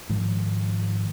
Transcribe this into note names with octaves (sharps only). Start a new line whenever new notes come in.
G#2 D#3 F3